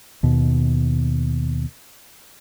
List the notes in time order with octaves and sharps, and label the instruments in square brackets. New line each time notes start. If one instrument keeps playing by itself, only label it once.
[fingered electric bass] D#2 B2